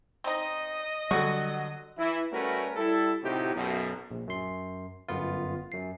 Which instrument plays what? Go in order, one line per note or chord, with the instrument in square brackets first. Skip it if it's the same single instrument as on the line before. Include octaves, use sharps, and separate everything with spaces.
[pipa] C4 D#4 [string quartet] D#5
[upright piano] D3 F#3 [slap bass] G3 [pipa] F#4
[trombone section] E3 E4
G3 A3 C#4 F#4 A#4 B4
G3 E4 A4
A2 C3 D#4 E4 F#4 G4
B1 F#2 B2
[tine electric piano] A#1
F#2 C6
G1 F#2 B3 F4
F#2 C7